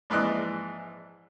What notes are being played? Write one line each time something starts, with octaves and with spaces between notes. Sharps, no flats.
A#1 G#2 E3 D5 D#5 F#6